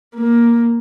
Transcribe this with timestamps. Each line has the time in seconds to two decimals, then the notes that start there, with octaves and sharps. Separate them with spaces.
0.15 A#3